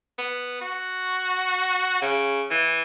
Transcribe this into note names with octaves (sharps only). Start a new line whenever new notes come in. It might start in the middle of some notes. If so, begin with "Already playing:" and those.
B3
F#4
C#3
E3